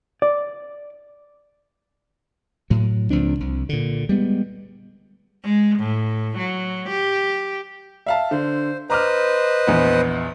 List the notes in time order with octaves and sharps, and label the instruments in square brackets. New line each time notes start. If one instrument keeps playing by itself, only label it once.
[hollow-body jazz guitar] D5
[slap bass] A2 F#3
C#2 F3 C4 D4
C2
A#2 D3
G3 G#3 B3
[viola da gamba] G#3
A2
F#3
G4
[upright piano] E5 F5 A5
[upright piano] D3 [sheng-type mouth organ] C5
[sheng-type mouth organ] B4 C5 D#5 [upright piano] A#5 D6 F6
[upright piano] A#1 E2 B3